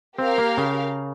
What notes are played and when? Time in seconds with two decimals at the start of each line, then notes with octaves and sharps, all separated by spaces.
0.19 C4 G4 A#4 F5
0.38 A#3
0.57 C#3